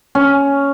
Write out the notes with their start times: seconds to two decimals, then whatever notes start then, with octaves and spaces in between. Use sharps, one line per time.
0.15 C#4